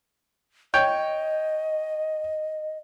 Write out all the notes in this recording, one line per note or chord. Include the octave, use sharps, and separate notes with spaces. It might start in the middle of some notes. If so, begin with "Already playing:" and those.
C#5 D#5 G5